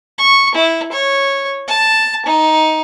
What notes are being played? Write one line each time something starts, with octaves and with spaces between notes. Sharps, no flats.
C#6
E4
C#5
A5
D#4